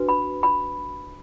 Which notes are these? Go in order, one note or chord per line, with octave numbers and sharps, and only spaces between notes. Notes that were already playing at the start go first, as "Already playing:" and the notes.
Already playing: D4 F#4 B4
B5
B5